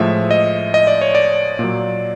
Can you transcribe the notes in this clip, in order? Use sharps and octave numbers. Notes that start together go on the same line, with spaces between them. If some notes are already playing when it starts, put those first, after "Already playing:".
Already playing: A2 F3 G#3 E5
D#5
D#5
D5
C#5
D5
A#2
F#3